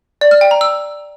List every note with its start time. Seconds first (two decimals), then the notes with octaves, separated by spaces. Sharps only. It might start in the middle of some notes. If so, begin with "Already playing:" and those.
0.21 D5
0.31 F6
0.41 G5
0.51 A#5
0.61 E6